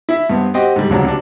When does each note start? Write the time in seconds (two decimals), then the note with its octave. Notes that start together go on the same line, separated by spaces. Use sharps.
0.09 E4 E5
0.30 G2 B3 C4
0.54 C4 F#4 G4 C5 D#5 G5
0.76 G#2 D3 G3
0.90 D1 C#2 C3 F#3 D4 A#5
1.04 C3 D4